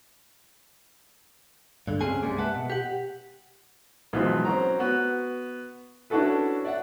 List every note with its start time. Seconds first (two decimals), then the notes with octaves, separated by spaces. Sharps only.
1.87 G2 D3
2.01 C#2 C4 C#4 G#4 G#5
2.22 C2 G2 G3 G#3 A#3
2.38 B4 E5 F#5 A5
2.55 B2
2.70 G4 F#5
4.13 B1 G#2 E3 F3 B3
4.45 C4 C#4 F#4 A#5
4.79 B3 F#4
6.10 C#4 D4 E4 F#4 A4 B4
6.65 D5 E5 F#5